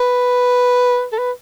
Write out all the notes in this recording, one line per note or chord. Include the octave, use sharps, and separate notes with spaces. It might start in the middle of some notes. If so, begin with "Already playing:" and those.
Already playing: B4
A4
B4